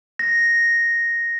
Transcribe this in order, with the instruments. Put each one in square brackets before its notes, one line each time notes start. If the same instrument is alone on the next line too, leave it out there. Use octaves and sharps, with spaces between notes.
[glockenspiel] A#6